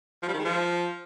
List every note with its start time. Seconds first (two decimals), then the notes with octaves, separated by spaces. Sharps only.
0.22 F3
0.28 G3
0.34 D#3
0.39 G#3
0.45 F3